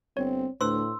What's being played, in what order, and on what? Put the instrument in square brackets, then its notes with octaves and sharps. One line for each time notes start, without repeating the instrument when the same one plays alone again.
[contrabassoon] G1 [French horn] C4 [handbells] C#5
[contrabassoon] D2 [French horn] A2 [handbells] D4 B4 C5 [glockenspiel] C6 E6